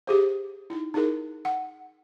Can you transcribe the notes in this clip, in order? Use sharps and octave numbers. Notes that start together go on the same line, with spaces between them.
G4 G#4 C5
D#4 E4
D#4 E4 G#4 A#4
F#5